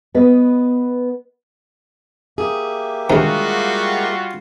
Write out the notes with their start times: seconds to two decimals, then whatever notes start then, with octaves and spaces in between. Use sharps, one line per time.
0.14 B3 B4 D#5
2.38 A#3 G4 G#4 E5
3.10 D2 C3 D#3 G3 G#3 F4 F#4 G#4